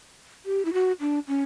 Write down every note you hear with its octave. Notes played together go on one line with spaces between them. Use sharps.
G4
E4
F#4
D4
C#4